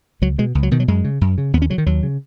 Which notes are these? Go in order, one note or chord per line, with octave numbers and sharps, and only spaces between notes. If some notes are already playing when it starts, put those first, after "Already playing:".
C#2 F#3
B2 G#3
C#2
F#3
B2 D#3
F#3
F#2 G#3
C#3
F#2
C#3
D#2 B3
C#4
C#3 F#3
D#3
D#2 F#3
C#3